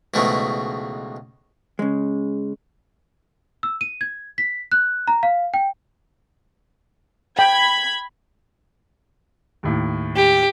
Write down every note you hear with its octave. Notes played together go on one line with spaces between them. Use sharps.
C#2 G#2 B2 E3 A3
C#3 G#3
E6
D#7
G#6
B6
F#6
A#5
F5
G5
G5 B5 G#6
D#2 A2
G4